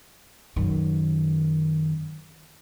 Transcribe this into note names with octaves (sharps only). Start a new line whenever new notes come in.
F#2 D#3